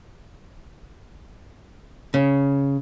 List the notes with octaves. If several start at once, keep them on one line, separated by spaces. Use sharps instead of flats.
C#3